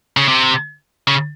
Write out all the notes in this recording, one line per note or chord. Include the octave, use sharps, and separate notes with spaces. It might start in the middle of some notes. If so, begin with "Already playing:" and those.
C#3
C3
C#3